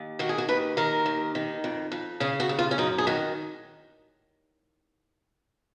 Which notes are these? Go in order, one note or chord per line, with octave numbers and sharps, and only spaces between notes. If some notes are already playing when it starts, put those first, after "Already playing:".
Already playing: D#2
D#3 F#4
G#4
F#4
D#2 B4
D#3 A#4
D#2
D#3
F2
F2
C#3 G#4
F#4
D#2
F4
C#4
F#2 D#4
G#4
D#3 F#4